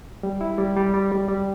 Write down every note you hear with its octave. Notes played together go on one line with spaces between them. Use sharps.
G3
E4
G3
G3
G3
G3
G3